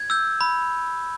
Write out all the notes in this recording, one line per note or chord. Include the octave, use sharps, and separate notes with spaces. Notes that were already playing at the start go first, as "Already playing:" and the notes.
Already playing: G#6
E6 G6
B5